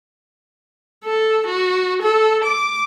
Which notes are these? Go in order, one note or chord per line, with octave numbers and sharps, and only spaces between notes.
A4
F#4
A4
D6